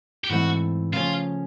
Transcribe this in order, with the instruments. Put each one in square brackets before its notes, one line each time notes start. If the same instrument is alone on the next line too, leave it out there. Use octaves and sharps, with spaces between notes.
[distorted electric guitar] G4
[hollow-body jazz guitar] G#2 E3 A3 C4 [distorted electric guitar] F#4
[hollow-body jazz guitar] C#3 F3 A3 C#4 [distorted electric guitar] F4